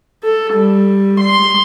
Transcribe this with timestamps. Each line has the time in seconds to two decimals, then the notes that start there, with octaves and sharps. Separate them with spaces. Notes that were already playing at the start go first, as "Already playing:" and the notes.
0.23 A4
0.54 G3
1.20 C6